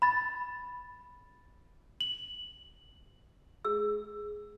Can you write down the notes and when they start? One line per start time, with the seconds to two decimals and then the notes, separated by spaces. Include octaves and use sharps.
0.02 B5 A6
2.01 F#7
3.65 G#4 E6